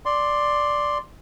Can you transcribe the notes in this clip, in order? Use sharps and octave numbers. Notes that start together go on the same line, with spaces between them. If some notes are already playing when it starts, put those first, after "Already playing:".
D5 C6